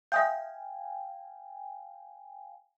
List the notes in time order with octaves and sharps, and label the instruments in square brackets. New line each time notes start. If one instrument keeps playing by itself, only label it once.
[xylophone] E5 D#6 G6 [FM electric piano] F5 G5 G#5